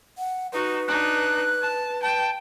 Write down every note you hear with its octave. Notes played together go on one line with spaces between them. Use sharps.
F#5
D#4 F#4 B4
D4 D#4 F#6
A5
G5 A5